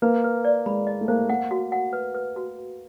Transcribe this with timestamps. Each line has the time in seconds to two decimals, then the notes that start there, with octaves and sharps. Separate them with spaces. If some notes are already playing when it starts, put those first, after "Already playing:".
0.02 A#3 B4
0.24 B4
0.45 D5
0.66 G#3 B5
0.87 D#5
1.01 A3
1.08 A#3 C5
1.29 A#3 F#5
1.51 F#4
1.72 F#5
1.93 B4
2.14 B4
2.36 F#4
2.57 B4